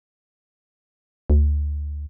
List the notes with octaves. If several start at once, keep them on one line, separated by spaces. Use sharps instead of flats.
D2